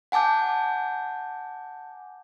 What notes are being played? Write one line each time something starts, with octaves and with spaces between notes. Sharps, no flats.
F#5 G#5 A5 D6 G6